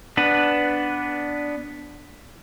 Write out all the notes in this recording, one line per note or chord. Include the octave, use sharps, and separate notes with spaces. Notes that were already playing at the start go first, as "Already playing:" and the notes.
B3 D4 B4